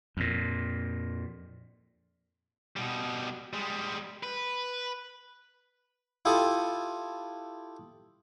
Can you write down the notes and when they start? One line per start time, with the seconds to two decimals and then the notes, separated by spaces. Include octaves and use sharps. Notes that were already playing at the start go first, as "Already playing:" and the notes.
0.17 F2 A#2
2.76 B2 G3
3.53 G3 G#3
4.23 B4
6.25 E4 F4 G4 A4 D#6